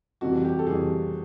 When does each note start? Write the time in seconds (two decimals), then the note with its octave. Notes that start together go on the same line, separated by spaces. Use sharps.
0.21 F2 C3 E3 G3 F#4
0.45 G4
0.59 A4
0.67 F2 C3 E3 G3 G#4